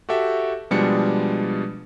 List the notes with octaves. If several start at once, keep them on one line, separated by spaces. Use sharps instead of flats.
F#4 G4 A4 E5 G5
B2 F3 G3 G#3 D4 C#7